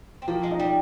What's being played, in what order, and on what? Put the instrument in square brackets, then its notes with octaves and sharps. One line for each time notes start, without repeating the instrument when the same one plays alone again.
[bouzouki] C4
[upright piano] F3 [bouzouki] A#3
[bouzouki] G#3
[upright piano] D#4
[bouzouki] G3